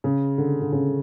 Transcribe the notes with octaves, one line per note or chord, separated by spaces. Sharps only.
C#3
D3
D3
C#3